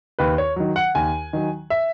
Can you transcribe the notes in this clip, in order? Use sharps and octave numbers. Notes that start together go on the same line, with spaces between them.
D#2 B4
C#5
D#3 F#3
F#5
D#2 G#5
D#3 F#3
E5